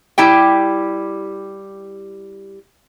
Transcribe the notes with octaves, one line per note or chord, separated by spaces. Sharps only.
G3 E4 G4 G5